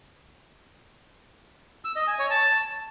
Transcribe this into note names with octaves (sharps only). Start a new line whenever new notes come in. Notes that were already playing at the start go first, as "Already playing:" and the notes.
E6
D#5
G#5
C#5
A5